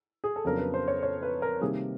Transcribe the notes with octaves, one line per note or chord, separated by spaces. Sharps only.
G#4
A4
F2 C#3 F#3 B3 D4 A#4
B4
C5
C#5
C#5
B4
A#4
C3 D#3 G3 A#3 G#4